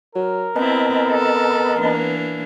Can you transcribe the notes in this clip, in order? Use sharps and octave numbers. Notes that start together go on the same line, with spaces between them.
F#3 A#4
B3 C4 E4 D#5 A5 B5
A4
E3 A#3 D4